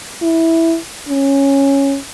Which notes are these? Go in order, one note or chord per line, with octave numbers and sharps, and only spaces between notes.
E4
C#4